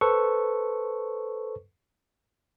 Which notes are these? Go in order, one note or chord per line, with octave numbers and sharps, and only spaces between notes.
A4 B4 C5 C#6